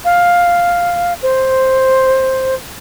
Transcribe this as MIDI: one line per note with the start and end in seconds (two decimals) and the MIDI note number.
0.04 1.13 77
1.22 2.54 72